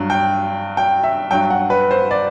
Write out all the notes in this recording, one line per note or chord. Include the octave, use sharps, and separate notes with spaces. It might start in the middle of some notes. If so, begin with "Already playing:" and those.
Already playing: G2 F#3
G5
G5
E5
G2 F#3 G5
F#5
B4
C5
D5